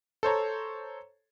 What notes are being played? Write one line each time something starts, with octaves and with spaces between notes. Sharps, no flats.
A4 C5 C#5 A#5